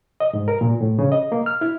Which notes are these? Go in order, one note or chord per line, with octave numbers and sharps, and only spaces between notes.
D#5
G#2
A#4
A#2
A2
C#3
D#5
A#3
F6
E4